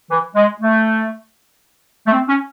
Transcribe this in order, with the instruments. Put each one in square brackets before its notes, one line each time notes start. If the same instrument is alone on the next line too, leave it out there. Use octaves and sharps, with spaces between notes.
[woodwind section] E3
G#3
A3
A3
C4
C#4